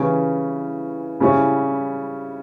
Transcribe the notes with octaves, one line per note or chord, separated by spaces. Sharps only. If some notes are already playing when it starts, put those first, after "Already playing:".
Already playing: C#3 E3 G3 C#4
C#3 G3 C#4 E4